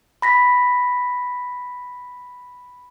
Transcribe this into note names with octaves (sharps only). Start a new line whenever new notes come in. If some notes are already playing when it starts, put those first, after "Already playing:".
B5 A#6 B6